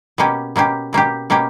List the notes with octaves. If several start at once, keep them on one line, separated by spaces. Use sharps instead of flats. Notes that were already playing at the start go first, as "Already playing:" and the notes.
B2 A#3 C#4 G4
B2 A#3 C#4 G4
B2 A#3 C#4 G4
B2 A#3 C#4 G4